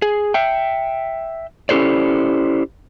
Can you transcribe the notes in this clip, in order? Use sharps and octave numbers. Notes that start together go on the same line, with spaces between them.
G#4
E5 G5
C#4 E4 G4 A4 C5 D5